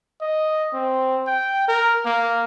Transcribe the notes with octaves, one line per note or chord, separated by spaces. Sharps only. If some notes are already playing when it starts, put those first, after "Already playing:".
D#5
C4
G5
A#4
A#3